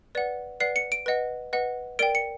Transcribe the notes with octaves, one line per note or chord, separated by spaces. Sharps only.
B4 D5 F#5
B4 D5 F#5 C7
C#7
D7
B4 D#5 F#5
B4 D#5 F#5
A#4 D5 G5 D7
C#7